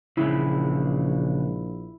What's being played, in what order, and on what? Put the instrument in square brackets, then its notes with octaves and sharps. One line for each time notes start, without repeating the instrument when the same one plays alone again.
[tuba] A#1 [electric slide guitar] C#3 E3 G#3 [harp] E4